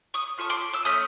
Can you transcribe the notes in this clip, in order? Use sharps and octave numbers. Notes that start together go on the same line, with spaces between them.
C#6 D#6
C#4 F4 A4 C#6 D#6
C6 D6
D6 E6
A3 C#4 D#6